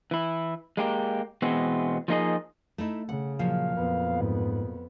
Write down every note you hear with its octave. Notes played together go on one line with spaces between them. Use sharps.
E3 E4
G#3 A#3 G4
B2 E3 G#3 B3 C4
F3 A#3 D#4 G#4 D#5
A3 D#4 E4
C#3 F#5
A#2 F3 F#3 F5
F2 B3
G#2